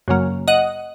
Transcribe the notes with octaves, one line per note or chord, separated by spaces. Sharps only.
F#2 C#3 F#3 A#3
D#5 F#5